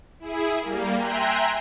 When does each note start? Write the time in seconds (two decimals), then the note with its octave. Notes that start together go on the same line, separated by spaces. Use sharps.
0.20 E4 G#4
0.61 G3 A#3
0.96 E5 G5 G#5 A#5 C6 F#6